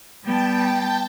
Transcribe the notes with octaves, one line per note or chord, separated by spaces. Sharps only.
G3 B3 G5 A5